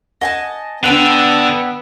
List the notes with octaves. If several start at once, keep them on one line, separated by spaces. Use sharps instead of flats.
D#5 F#5 G#5 A5
D3 B3 D4 E5 G5 A5 F#6